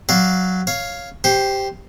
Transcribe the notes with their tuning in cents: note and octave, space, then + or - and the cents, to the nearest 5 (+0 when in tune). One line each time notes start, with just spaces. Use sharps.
F#3 +0 D5 -10 F5 -5
C#5 +0 F5 +0
G4 +0 C5 +0 C6 +35